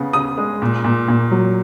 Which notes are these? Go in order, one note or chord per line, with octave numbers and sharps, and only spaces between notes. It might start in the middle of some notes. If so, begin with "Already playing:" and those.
Already playing: C#3 B3
C#3 D#6
G#3
A#2
A#2
A#2
F#3